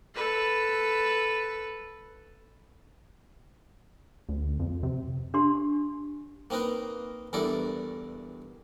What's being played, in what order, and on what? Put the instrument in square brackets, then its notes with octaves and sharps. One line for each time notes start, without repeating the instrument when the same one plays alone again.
[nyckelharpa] A4 B4
[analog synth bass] D2
F2
C3
[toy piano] D4 G4 C6
[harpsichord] A#3 C4 D#4 A#4 B4
E2 G2 E4 A4 A#4 D5